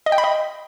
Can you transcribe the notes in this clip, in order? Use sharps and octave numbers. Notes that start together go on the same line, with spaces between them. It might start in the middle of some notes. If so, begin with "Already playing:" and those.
D#5
G5
B5
D#5